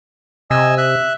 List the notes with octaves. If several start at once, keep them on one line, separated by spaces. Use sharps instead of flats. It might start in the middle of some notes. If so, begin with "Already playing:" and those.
C3 D#5 G#5 E6
E5 F#6